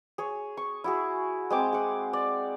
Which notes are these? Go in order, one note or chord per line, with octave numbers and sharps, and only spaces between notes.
G#4 C#5
C#6
E4 F#4 G#4
G#3 C4 D6
G#4 F#5
D5